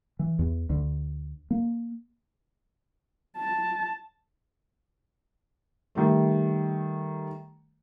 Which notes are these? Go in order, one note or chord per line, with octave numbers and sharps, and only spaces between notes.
E3
E2
D2
A#3
A5
D#3 G3 A3